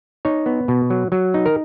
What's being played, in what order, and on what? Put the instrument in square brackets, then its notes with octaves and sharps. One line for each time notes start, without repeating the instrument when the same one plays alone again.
[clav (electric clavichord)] D#4 C#5
B3
B2
F#3
F#3
D#4
A#4